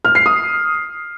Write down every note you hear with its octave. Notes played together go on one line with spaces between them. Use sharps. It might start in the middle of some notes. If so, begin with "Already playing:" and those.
F6
C7
D#6